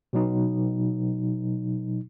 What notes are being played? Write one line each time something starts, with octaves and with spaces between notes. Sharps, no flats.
B2 F#3 D#4